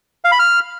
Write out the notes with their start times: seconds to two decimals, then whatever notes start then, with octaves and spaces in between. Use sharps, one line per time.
0.24 F5
0.32 B5
0.39 F6